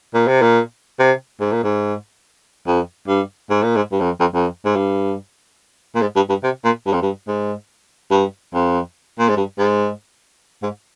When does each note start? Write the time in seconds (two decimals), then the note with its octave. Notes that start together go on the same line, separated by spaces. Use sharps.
0.14 A#2
0.28 C3
0.42 A#2
0.99 C3
1.41 G#2
1.53 A#2
1.64 G#2
2.67 F2
3.08 G2
3.50 G#2
3.63 A#2
3.76 G#2
3.92 G2
4.01 F2
4.20 F2
4.34 F2
4.65 G#2
4.76 G2
5.95 A#2
6.01 G#2
6.16 G2
6.29 G2
6.43 C3
6.64 A#2
6.86 G2
6.93 F2
7.02 G2
7.28 G#2
8.11 G2
8.54 F2
9.19 A#2
9.29 G#2
9.37 G2
9.59 G#2
10.63 G#2